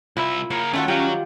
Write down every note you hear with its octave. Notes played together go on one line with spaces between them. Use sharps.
C2 E4 F4 E5 B5
C#3 A#3 C#5
D#3 A3 C#4 F4 F#4
F#3 G3 F4 G4 F5 G5